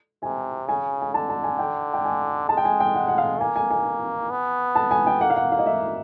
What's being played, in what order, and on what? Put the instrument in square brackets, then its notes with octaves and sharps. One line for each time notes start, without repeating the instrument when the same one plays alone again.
[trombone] C3 [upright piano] G#5
[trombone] C#3 [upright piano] G#5
[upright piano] G#5
[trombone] D3 [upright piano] A5
[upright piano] A5
G#5
G5
G5
G#5
[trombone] G#3 [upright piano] A5
[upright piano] G5
G#5
G5
F#5
F#5
F5
[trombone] A#3 [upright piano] G#5
[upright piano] G#5
G#5
[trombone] B3
[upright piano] A5
G#5
G5
[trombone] A#3 [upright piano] F#5
[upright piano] F5
F#5
F5
D#5
E5